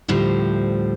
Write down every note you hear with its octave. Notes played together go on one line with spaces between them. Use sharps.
D2 A2 F3 G3 C5